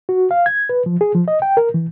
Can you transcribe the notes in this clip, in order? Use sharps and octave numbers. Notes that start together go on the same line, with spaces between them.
F#4
F5
G#6
B4
F3
G#4
F3
D#5
G5
A#4
E3